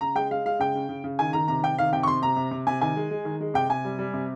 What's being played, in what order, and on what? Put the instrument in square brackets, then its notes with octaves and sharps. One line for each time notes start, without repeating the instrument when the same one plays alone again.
[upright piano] C#3 A#5
G#3 G5
G#3 F5
G#3 F5
C#3 G5
C#3
C#3
C#3
D#3 G#5
D#3 A#5
C3 A#5
C3 G5
D#3 F5
C3 G5
C#6
C3 C6
C3 A#5
C3
C3
C3 G#5
D#3 G#5
G#3
G#3
D#3
G#3
C3 G5
C3 G#5
G3
G3
C3